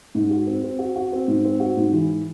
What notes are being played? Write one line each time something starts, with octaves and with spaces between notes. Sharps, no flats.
G#2
F#4
C4
C4
F#4
F#4
C4
G#2
C4
F#4
G#2
E3